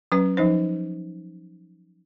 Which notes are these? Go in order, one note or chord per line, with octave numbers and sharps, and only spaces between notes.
F#3 C#4 B4
F3 D#4 C5